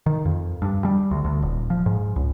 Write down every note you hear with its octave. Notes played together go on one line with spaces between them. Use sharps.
D#3
F2
G2
G3
D2
D2
D#1
F3
G#2
C#2